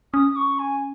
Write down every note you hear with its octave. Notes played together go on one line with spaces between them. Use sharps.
C#4 D#6
C#6
G#5